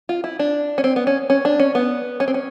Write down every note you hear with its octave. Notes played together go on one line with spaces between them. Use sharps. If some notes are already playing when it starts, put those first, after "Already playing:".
F4
E4
D4
C#4
C4
B3
C#4
C#4
D4
C#4
B3
C#4
C4
C#4